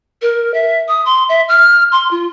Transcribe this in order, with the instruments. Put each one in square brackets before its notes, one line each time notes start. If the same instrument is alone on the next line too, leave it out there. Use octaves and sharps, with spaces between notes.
[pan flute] A#4
E5
D#6
C6
E5
F6
C6
F4